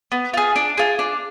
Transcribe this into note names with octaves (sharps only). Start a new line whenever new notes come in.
B3
F4 G#4
D4
F4 G#4
D4